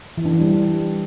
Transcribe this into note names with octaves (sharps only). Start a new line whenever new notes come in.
E3
D4
E3
G3